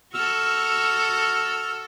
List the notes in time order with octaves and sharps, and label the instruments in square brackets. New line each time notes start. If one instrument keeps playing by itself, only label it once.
[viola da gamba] F#4 A4 [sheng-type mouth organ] E6 F6